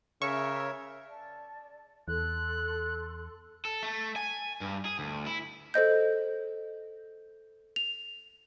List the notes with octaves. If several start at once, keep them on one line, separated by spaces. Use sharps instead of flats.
C#3 A#4 C#5 E5 C#6
D5 A5
E2 A4 C6 F#6
A4
A3
G#5
G2
G#4
D2
E4
A4 C5 D#5 G6
F7